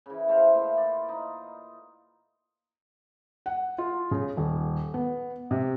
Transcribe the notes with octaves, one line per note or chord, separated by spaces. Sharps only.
C#3 E3
A3 C5 F5
A#2 E4 F4 F5
D5
D#4
F#5
F4
C#3
D#1
B3
C3